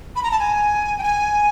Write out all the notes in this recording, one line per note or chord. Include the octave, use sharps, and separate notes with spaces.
B5
A#5
A5
G#5
G5
G#5